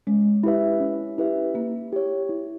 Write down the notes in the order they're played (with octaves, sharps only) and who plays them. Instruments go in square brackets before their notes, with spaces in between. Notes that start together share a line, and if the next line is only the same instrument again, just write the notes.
[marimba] G#3 [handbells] C#4
[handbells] E4 G4 B4 E5
C#4
E4 G4 B4 E5
[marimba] A#3 [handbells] E4
[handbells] G4 C#5
E4